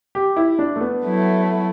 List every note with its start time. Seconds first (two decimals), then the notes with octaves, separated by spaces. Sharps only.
0.15 G4
0.37 E4
0.59 D4
0.76 A3
0.81 B3
1.03 F#3 A3 E4